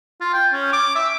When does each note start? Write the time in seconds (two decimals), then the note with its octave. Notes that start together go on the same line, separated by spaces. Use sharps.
0.21 F4
0.33 G5
0.53 C#4
0.73 D6
0.95 E5